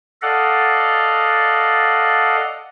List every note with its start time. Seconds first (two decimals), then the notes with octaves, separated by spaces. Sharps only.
0.22 A4 D5 D#5 F5 F#5